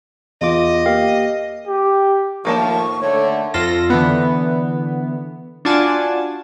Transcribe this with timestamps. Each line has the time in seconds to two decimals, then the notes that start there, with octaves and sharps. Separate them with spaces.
0.41 E2 F4 D#5 D6
0.86 A#3 G4 F5
1.67 G4
2.45 A2 D#3 F3 A#3 A5 C#6
3.01 D3 A3 C#5
3.54 F2 F4 A4 A#6
3.90 D3 E3 B3
5.65 D4 F4 F#4 D5 G#5 A5